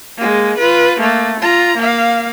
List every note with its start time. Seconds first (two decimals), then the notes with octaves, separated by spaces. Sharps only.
0.18 G#3 A#3
0.58 F4 B4
0.99 A3 A#3
1.40 F4 A#5
1.78 A#3 F5